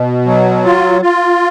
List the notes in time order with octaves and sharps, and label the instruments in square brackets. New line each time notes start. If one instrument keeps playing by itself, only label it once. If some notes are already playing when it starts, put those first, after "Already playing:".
Already playing: [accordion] B2
F#3
F4
F4